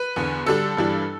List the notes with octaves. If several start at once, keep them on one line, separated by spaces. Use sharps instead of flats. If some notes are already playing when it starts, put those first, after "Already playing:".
Already playing: B4
E2 D3 B3
D3 G3 D4 A4
G2 E3 G3 D4